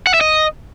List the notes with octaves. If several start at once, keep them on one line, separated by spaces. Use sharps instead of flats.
F#5
E5
D#5